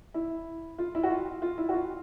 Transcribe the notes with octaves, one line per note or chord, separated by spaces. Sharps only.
E4
F4
E4
F#4
F4
F4
E4
F#4
F4